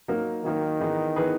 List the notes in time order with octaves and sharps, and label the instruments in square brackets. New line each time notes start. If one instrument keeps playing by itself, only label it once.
[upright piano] F#3 A#3 D#4 A#4
[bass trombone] D#3 [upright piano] F#3 A#3 D#4 A#4
[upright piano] E3 B3 D#4 G#4 B4
E3 B3 D#4 G#4 B4